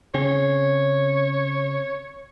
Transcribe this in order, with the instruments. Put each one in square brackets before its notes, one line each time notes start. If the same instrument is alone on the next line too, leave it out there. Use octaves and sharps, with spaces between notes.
[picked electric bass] C#3 C4 C#4 [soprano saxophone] C#5